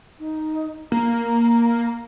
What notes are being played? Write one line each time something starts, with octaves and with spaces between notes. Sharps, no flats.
D#4
A#3 A#5